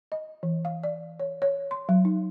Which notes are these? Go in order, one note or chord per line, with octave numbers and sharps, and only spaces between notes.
D#5
E3
F5
D5
C#5
C#5
C6
F#3
D#4